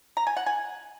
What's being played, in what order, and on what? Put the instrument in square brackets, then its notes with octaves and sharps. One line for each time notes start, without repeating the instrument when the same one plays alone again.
[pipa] A#5
G#5
F#5
G#5